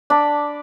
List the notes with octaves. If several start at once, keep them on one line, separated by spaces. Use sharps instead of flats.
D4 B5